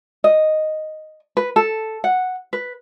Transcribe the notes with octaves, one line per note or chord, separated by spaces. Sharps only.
D#5
B4
A4
F#5
B4